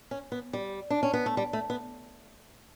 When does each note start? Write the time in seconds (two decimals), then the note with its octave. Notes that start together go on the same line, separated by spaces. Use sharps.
0.11 C#4
0.32 B3
0.53 G3
0.90 D4
1.03 C#4
1.14 B3
1.26 A3
1.37 G3
1.53 A3
1.70 B3